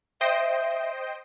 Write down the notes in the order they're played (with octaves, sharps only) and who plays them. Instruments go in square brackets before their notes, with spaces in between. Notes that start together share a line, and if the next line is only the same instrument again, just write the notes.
[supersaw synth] C5 D#5 G5 [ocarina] E5